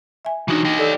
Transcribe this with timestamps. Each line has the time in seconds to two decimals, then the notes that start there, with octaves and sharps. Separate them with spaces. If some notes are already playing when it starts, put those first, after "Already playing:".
0.25 E5 G#5
0.48 E3 D4 D#4 F#4
0.65 G4 D#5
0.79 A4 D5 E6